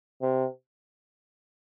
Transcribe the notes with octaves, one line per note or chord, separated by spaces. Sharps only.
C3